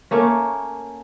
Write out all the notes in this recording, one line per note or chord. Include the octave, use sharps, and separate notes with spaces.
A3 A#3 C#4